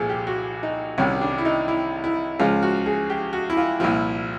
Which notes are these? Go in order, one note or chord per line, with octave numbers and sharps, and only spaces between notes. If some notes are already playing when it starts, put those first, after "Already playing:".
Already playing: C2 A#2 F3 G#4 A4
G4
F#4
D#4
C2 C3 D#3 G3 C#4
D4
E4
D#4
E4
E4
C#2 C#3 F3 F4
F#4
G#4
G4
F#4
E4
F4
C2 A#2 F3 E4